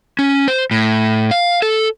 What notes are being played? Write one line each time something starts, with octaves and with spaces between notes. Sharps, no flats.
C#4
C5
A2
F5
A4